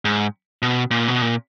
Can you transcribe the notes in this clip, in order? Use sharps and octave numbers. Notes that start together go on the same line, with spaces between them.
G#2
B2
A#2
B2
A#2